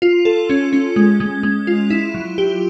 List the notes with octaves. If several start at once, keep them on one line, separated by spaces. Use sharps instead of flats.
F4
A4
C#4
C#4
G#3
G#3
G#3
F4
E4
F#3
G4